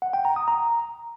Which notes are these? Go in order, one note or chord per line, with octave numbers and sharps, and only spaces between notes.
F#5
G5
A#5
D#6
A#5